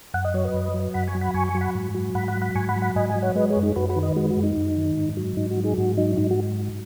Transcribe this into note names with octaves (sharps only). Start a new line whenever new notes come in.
F#2 F#5
D#5
F#3 C#5
B4 D#5
F#2
F#3
F#2 F#5 B5
G#5 C#6
F#3
F#5 B5
F#2 G#5 C#6
G#5 C#6
F#3
F#5 B5
G#2
F#3
G#2 F#5 B5
F#5 B5
F#3
F#5 B5
G#2 G#5 C#6
F#5 B5
F#3
F#5 B5
G#2 D#5 G#5
D#5 G#5
F#3
C#5 F#5
G#3 B4 D#5
G#4 C#5
F#2
D#4 G#4
F#2 F#4 B4
F#4 B4
D#3
B4 D#5
G#3 F#4 B4
F#4
F#2
D#4
F#2
D#3
G#2
F#3
G#2 D#4
F#4
F#3
D#4 G#4
G#2 F#4
F#3 D#4
G#2 D#4
F#4